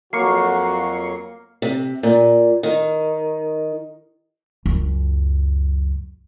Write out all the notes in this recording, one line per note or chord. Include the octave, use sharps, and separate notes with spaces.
F2 F#3 A#3 F#4 C#6 C7
C3
A#2
D#3
C#2 F#2